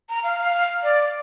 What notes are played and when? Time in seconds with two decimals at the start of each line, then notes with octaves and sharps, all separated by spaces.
0.09 A#5
0.24 F5
0.83 D5